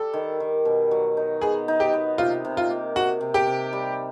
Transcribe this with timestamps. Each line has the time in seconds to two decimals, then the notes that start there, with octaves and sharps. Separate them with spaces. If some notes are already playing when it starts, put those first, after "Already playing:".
Already playing: G3 A4
0.13 D#3
0.40 D#3
0.65 B2
0.91 F#3
1.17 D#4
1.41 B3 G#4
1.68 D#4
1.80 G4
1.93 B3
2.18 C3 F4
2.45 C3
2.57 F4
2.70 A#3
2.95 C3 F#4
3.21 C3
3.34 G4
3.47 C3
3.73 G3